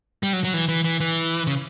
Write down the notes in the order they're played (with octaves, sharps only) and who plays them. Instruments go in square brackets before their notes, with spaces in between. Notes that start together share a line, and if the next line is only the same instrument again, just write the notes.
[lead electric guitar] G3
F#3
F#3
E3
E3
E3
E3
C#3